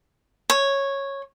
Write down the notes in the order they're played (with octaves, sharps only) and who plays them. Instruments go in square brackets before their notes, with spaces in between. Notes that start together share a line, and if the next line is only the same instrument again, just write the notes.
[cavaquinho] C#5